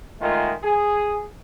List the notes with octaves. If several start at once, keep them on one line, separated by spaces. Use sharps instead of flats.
A#2 D#3 G#3 A3 F4
G#4